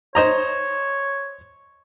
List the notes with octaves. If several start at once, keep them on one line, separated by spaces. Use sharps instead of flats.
C5 C#5 D#5 A#5